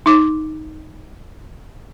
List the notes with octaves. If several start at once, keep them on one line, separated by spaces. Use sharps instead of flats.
D#4 D6